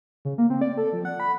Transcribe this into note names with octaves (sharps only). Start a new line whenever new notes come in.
C#3
A#3
C4
D5
A4
F3
F#5
B5